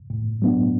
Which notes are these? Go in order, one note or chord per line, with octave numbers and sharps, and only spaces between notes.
A2
F#3 B3 D4